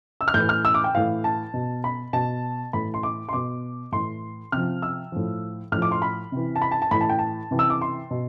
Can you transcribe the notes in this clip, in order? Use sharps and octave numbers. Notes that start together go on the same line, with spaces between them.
E6
F6
A2 E3 G6
F6
E6
D6
G5
A2 E3 F5
A5
B2
B5
B2 A5
A2 E3 B5
C6
D6
C6
B2 D6
A2 E3 C6
C3 F3 F6
E6
A2 F3
A2 F3 F6
D6
C6
B5
C3 E3
A5
B5
A5
A5
A2 E3 B5
A5
G5
A5
C3 E3
E6
D6
C6
B2